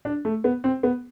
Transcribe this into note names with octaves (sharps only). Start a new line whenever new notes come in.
D4
A3
B3
C4
B3